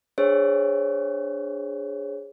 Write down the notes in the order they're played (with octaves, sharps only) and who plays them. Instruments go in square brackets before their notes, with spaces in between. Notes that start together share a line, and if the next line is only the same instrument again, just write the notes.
[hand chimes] D4 G#4 C5 C#5